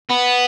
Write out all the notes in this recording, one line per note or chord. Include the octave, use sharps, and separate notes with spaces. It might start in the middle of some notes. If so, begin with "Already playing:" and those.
B3